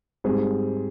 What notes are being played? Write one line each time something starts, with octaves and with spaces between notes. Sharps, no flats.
G#2 G3 C4 G#4